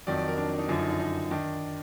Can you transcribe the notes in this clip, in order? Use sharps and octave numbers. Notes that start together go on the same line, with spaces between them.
F2 D#3 F#3 D5
D5
A#4
D4
D#4
F#2 D3 F3 D4
D#4
D#4
D#4
D#3 D4